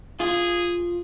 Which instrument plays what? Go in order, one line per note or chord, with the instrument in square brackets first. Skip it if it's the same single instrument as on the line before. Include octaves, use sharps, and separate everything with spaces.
[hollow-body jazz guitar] F4 [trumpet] G#4